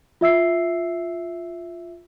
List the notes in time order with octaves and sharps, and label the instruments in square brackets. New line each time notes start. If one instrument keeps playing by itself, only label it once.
[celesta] F4 E5 E6 C7